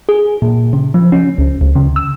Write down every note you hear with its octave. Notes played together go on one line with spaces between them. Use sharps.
G#4
A#2
C#3
F3
C#4
C#2
C#2
C#3
E6